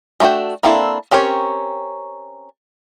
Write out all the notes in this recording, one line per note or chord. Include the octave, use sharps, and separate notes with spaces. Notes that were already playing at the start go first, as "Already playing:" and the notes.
G#3 A3 D4 F#4 G5
A#3 C4 D4 E4 A4
C4 C#4 G4 A#4 C#5